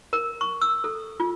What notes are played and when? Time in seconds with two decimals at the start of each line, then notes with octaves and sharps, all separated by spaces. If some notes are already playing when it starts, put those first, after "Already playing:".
0.13 A#4
0.41 C#6
0.61 E6
0.84 A4
1.20 F4